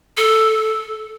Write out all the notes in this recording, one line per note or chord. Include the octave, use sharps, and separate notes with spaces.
A4